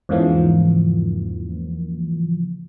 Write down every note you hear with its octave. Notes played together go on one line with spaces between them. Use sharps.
E2 G#2 C#3 E3 F3 A#3